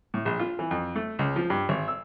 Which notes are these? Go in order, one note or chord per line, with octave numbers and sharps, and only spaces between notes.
A2
A#1
F4
E3
F2
A3
C#2
F3
G2
G#1
E6